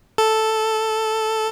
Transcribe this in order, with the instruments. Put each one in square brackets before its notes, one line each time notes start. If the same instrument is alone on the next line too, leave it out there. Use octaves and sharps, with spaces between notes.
[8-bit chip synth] A4